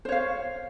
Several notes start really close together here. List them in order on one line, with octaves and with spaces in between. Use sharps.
C5 C#5 F5